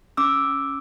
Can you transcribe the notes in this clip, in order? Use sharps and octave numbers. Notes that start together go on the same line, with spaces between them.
C#4 D6 E6
C#4